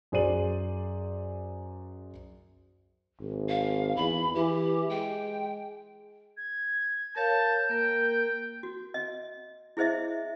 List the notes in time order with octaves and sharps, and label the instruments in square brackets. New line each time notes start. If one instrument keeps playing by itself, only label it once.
[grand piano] F#2 G#4 C5 D5 D#7 F#7
[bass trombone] G#1
[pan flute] F5
[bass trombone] E2 [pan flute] B5
[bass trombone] E3 [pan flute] G4
[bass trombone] G#3 [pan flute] G5
[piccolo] G#6
[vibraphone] A#4 C#5 F5 [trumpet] A5 [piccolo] G6
[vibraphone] A#3 A#4 [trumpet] G5
[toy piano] F#4
D#5
E4 G#4 C5 D#5 E5